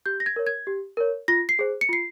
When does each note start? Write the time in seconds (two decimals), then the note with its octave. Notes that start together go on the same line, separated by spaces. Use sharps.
0.06 G4 G6
0.20 A#6
0.26 G#6
0.36 A#4 C#5
0.47 G#6
0.67 G4
0.97 A#4 C#5
1.28 F4 A#6
1.49 C7
1.59 G#4 C5
1.81 C#7
1.89 F4 C7